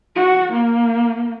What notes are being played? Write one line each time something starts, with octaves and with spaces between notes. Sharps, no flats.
F#4
A#3